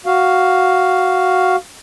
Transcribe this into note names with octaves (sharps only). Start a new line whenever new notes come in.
F#4 F5